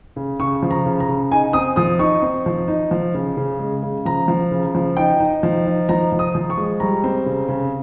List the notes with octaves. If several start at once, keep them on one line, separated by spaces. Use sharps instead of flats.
C#3
C#3 C#6
F3
A#5
C#3
A#5
C#3
D#4 G#5
C4 D#6
F3 D#6
D#4 C#6
C4
F3
D#4
F3
C#3
C#3
G#3
C#3
F3 A#5
F3
C#3
F3
D#4 G5
D#4
F3
D#4
F3 A#5
F3
D#6
F3
C#6
G#3
G3 A#5
C4
C#3
C#3